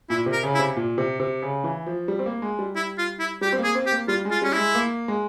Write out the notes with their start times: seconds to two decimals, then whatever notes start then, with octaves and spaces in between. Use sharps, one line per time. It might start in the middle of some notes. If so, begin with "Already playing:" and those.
0.09 A#2 E4
0.26 C3
0.32 A#4
0.43 C#3
0.54 E4
0.59 C3
0.76 A#2
0.98 C3
1.20 C3
1.42 C#3
1.64 E3
1.86 F3
2.08 G3
2.19 C4
2.26 A#3
2.42 G#3
2.59 G3
2.75 E4
2.98 F4
3.19 E4
3.41 G3 G4
3.52 C4
3.58 A#3
3.64 G#4
3.75 C4
3.86 G4
3.92 A#3
4.08 G3 F4
4.25 G#3
4.31 F4
4.42 G3 C#4
4.52 E4
4.57 G#3
4.75 A#3
5.08 G#3